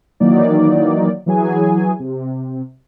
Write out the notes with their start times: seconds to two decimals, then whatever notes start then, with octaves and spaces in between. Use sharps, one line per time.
0.20 D#3 E3 F#3 A#3 D#4 D5
1.26 E3 F#3 G#4 G#5
1.99 C3